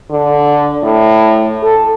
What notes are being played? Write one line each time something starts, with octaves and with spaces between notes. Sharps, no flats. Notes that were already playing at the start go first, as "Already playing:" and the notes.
D3
A2
A4